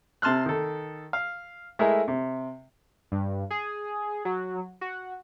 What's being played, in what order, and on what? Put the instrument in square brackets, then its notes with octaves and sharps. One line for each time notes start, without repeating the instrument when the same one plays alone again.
[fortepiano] C3 A5 C6 F6 F#6
D#3 A4
F5
G#3 A3 E4 G#4 A#4
C3
[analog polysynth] G2
G#4
F#3
F#4